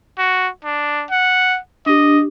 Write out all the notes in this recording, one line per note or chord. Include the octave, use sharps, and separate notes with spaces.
F#4
D4
F#5
D4 G4 D#5